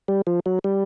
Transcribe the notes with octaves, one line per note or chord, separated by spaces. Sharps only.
G3
F3
F#3
G3